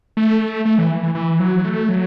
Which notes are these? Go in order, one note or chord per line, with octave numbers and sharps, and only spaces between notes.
A3
A3
E3
E3
E3
F#3
A3
F#3